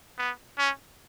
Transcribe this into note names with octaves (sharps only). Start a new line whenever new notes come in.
B3
C#4